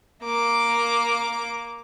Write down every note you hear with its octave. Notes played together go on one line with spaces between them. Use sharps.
A#3 D6